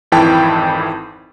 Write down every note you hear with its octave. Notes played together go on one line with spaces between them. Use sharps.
G#1 F2 E3 E4 G5 A5